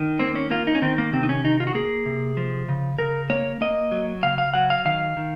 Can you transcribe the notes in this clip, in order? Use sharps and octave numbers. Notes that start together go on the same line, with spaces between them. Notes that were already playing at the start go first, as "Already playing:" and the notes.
Already playing: D#3
A#3 C4
C#4
A#3 F4
D#4
C#4
D#3 C4
A#3
C3 C4
D#4
C#4
D#3 D#4
F4
F#4
A#3 G#4
C3
F3
C#3
C#3 A#4
A#3 C#5
A#3 D#5
F#3
C#3 F5
F5
F#3 F#5
F5
D#3 F5
D#3